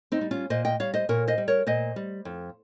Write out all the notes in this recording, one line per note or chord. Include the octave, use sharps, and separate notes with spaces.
C4 D#4
G3
C#4 F4
A#2 C5 D#5
D#5 G5
G3 C#5 F5
C5 D#5
A#2 A#4 C#5
C5 D#5
G3
A#4 C#5
A#2 C5 D#5
G3
F2